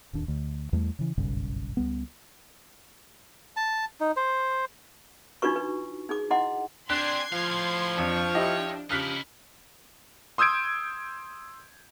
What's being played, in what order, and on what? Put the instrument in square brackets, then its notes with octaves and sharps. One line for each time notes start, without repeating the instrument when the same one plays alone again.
[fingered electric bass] D1 D#2 D4
D2
E2 G3 A3
C#3 E3
F#1 B1 G2 C#3
C#2 G3 B3
[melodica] A5
D#4
C5
[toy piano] D4 D#4 F4 F#4 B4 C#6
B4
D#4 G#4 D6
E4 D#5 F#5 C6 D6
[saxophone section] C4 D4 [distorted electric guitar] G4 G#4 [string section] C6 G#6 [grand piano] F#6
[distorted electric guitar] A2 F5 [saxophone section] F3
[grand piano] F2 [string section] D4 [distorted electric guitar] C#5
[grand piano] E4 G4 D#5
[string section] C#3 [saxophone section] F3 G4 [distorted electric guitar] D#4 E4 [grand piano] F6 F#6 B6
[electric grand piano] C6 D#6 E6 G6 G#6 D7